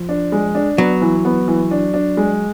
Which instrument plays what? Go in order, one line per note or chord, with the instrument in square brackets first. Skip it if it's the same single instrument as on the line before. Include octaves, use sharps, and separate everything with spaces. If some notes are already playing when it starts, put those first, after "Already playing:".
Already playing: [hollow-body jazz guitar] F3
[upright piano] D4
G#3
D4
[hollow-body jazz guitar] F#3 [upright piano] B3
[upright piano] E3
B3
E3
D4
D4
G#3